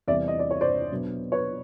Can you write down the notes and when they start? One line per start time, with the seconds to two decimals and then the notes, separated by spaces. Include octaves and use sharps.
0.07 E2 C3 E3 G3 C4 D5 E5
0.28 D#5
0.39 D5
0.51 C#5
0.61 C5 D5
0.91 B2 F#3 B3 D4
1.32 B4 C#5